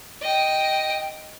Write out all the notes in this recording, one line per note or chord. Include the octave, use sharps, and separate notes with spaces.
D#5 G5